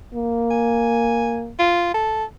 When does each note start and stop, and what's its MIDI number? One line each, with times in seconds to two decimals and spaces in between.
0.15 1.52 58
0.50 1.39 80
1.59 1.90 65
1.94 2.24 69